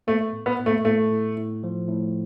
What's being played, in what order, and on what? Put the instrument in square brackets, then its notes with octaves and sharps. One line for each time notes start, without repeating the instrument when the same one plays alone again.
[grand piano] A3 [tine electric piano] B3
[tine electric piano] A2
[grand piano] B3
[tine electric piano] A2
[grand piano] A3
[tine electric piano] A2 [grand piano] A3
[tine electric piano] A2
A2
F3
A2